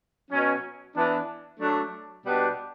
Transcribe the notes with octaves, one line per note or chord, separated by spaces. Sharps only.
B2 F#3 C#4
E3 B3 D4
F#3 A3 D4
B2 G3 B3 D4 G4